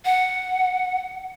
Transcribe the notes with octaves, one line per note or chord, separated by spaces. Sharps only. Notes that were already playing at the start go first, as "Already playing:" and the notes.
F#5